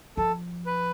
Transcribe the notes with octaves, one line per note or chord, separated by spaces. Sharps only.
F3 A4
B4